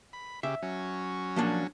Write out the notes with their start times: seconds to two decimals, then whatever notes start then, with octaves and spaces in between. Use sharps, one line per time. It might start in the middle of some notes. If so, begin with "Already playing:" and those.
0.13 B5
0.43 C#3 G4 E5
0.62 F#3 C#4
1.36 F3 A#3 D4